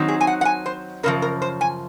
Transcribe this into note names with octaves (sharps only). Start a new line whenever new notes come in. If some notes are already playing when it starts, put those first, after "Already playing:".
Already playing: D#3 F#3 C4 D#4
G#4
G#5
F#5
F#5
G#5
C5
F#2 C#3 F3 A#4
A#4
C5
G#5